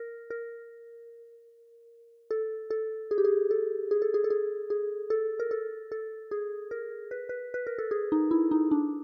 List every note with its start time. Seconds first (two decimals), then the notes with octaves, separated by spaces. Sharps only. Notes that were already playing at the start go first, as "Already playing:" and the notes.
Already playing: A#4
0.30 A#4
2.31 A4
2.70 A4
3.11 G#4
3.18 G4
3.25 G#4
3.51 A4
3.91 G#4
4.02 A4
4.14 G#4
4.24 A4
4.30 G#4
4.70 G#4
5.10 A4
5.40 A#4
5.51 A4
5.92 A4
6.31 G#4
6.71 A#4
7.11 B4
7.29 B4
7.54 B4
7.67 A#4
7.78 A4
7.91 G#4
8.12 D#4
8.31 E4
8.51 D#4
8.71 D4